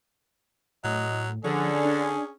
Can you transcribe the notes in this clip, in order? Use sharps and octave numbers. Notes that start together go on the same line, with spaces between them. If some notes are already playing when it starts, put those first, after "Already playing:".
A2 F#3 D#5
D3 F3 C#4 G#4
D4